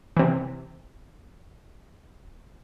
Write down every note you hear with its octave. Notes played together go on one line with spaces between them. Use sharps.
C3 E3